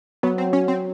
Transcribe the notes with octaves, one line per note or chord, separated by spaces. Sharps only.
F#3 B3
C4
C#4
C4